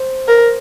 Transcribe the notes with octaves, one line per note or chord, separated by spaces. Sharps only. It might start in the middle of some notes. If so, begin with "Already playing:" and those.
Already playing: C5
A#4